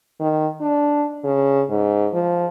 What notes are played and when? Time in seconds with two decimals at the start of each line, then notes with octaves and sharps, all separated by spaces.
0.20 D#3
0.61 D4
1.24 C#3
1.69 G#2
2.13 F3